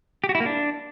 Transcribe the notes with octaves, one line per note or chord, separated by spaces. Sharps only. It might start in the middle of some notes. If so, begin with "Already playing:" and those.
G4
F#4
E4
A#3
D4